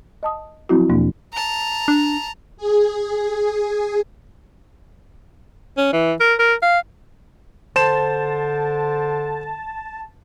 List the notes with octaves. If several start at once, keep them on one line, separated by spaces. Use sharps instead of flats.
D#5 A5 D#6
F3 F#3 C4 E4 F#4
E2 B2 F3 A#3 D4
A5 A#5
D4
G#4
C#4
E3
A#4
A#4
F5
D3 C5 A5 E7